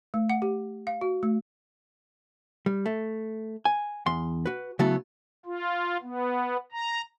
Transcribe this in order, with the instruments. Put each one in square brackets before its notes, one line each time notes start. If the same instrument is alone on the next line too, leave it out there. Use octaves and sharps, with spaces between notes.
[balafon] A3
F#5
G4
F5
F#4
A3
[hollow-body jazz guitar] G3
A3
G#5
E2 C6
F#4 B4
C#3 F#3 A3 B3 E4 A4
[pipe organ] F4
B3
A#5